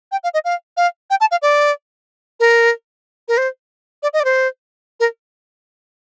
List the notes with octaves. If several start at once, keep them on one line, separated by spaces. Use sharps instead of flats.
G5
F5
D#5
F5
F5
G5
A5
F5
D5
A#4
A#4
C5
D5
D#5
D5
C5
A#4